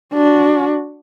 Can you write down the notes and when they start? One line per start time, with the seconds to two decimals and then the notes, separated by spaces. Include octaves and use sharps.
0.14 D4 F#4